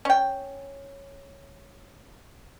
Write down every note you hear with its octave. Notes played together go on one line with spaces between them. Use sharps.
C#4 G5